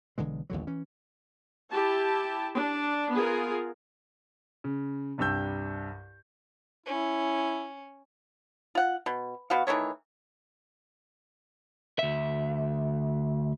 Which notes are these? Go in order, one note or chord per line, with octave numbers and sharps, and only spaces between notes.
B1 D3 E3 G#3
A1 D#2 D3 F#3
E3 C#4
E4 G4 A5
D4
B3 F4 G#4 A#4
C#3
C2 G2 G4 E6 G6
C#4 E4
F4 F#5
B2
B2 F#4 F5
D#3 E3 A3 C#5
D2 E5